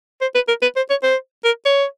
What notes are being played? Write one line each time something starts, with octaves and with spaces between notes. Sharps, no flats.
C5
B4
A#4
B4
C5
C#5
C5
A#4
C#5